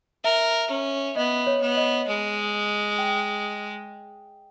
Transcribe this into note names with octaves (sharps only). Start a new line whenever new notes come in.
A#4 E5
C#4
B3 D#5
C#5
B3
D#5
G#3
G5